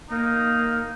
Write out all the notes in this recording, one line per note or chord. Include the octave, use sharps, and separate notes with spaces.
A#3 D#4